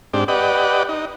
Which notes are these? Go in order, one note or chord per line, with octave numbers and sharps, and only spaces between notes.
G#2 C4 D4 G4
G4 B4 D5 D#5 F#5
D#4